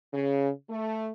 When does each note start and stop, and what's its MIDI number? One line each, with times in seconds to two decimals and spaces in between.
0.13 0.49 49
0.70 1.10 57